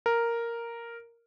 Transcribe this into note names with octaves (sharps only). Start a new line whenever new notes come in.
A#4